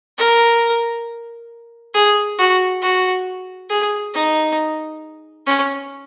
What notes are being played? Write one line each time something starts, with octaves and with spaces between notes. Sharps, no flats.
A#4
G#4
F#4
F#4
G#4
D#4
C#4